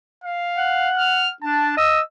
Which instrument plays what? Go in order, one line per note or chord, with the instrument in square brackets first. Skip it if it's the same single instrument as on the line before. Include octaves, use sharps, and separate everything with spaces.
[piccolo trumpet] F5
[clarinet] F#5
[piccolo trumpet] F6
[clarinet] D4 [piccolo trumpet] A5
[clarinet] D#5 [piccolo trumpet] E6